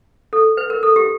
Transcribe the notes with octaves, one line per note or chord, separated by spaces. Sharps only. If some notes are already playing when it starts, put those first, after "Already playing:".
A4
B4
A#4
A4
G4